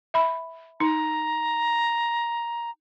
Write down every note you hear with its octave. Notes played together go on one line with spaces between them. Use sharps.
E5 B5
D#4 A#5